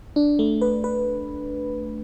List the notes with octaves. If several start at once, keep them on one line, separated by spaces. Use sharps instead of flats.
D4
A3
B4
B4